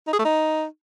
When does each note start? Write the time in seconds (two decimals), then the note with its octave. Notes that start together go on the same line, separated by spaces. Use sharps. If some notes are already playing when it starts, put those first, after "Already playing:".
0.07 D#4
0.13 G#4
0.19 A3
0.25 D#4